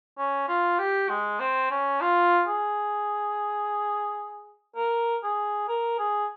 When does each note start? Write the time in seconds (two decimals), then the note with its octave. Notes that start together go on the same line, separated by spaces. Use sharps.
0.18 C#4
0.48 F4
0.79 G4
1.09 G#3
1.40 C4
1.71 C#4
2.01 F4
2.48 G#4
4.76 A#4
5.23 G#4
5.69 A#4
5.99 G#4